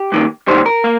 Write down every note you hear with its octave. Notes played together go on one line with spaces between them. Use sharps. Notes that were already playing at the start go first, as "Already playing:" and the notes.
Already playing: G4
G2 D#3 A#3
D#2 D#3 G3 C5
A#4
A#3